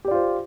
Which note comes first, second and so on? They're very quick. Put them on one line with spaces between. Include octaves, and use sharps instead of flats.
G4 D5 F4 C5